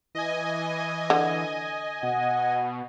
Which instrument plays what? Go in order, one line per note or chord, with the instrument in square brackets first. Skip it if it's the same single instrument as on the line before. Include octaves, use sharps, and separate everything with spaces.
[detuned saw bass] E3 [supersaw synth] D#5 G#5
[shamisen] D3
[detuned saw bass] B2 [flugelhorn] F#5